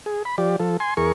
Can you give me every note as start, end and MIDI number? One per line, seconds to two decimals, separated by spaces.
0.06 0.23 68
0.25 0.36 83
0.38 0.56 53
0.38 0.56 67
0.38 0.56 74
0.60 0.77 53
0.60 0.77 69
0.80 0.94 80
0.80 0.94 84
0.97 1.12 40
0.97 1.12 68
0.97 1.12 70
0.97 1.12 85